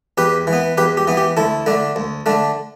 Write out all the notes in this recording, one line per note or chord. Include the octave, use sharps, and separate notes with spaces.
E2 G4 B4
E3
B3
E2 G4 B4
G4
E3 B3
G4
D2 E4 A4
D3 A3 D4
D2
D3 A3 D4